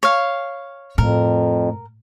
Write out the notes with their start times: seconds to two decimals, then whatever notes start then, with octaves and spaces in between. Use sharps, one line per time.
0.03 C#5 F5
0.98 F2 A2 A#4